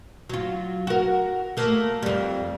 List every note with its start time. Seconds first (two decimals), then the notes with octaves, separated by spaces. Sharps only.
0.30 F#3 F4
0.87 F#4 A#4
1.57 A3 A#3
2.03 F2 G3